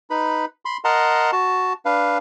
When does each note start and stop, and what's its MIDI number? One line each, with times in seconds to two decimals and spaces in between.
0.10 0.45 63
0.10 0.45 71
0.10 0.45 83
0.65 0.77 83
0.65 0.77 84
0.84 1.31 70
0.84 1.31 75
0.84 1.31 78
0.84 1.31 81
0.84 1.31 82
0.84 1.31 84
1.32 1.73 66
1.32 1.73 81
1.85 2.18 62
1.85 2.18 71
1.85 2.18 77